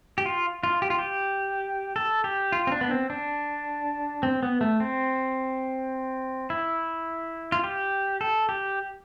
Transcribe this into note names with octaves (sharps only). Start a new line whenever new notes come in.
G4
F4
F4
G4
F4
G4
A4
G4
F4
C4
D4
B3
C4
D4
C4
B3
A3
C4
E4
F4
G4
A4
G4